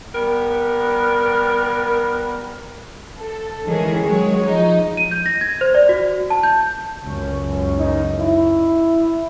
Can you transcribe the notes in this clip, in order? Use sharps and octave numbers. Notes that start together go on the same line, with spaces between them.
G3 B3 A#4
A4
D#3 E3 G#3 C#4 G#4
F#3 G#3 C#5
F3 D#4
D#7
G6
A#6
G#6
C5
D5
F#4
A5
G6
C#2 F#2 C#4
D#4
E4